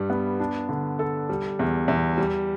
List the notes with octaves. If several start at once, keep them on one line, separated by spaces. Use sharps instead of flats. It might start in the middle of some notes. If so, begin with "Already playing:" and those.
Already playing: G2 G3
B3
D4
D3
A4
G3
E2
E2
G3